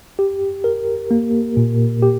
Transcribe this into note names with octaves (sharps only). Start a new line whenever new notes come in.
G4
A#4
A#3
A#2
G4